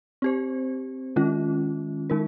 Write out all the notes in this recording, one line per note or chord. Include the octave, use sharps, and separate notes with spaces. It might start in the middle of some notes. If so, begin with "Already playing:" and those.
C4 G4 C5
D#3 G#3 C#4 F4
D#3 G#3 D#4 A#4